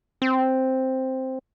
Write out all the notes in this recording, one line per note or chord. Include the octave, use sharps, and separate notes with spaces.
C4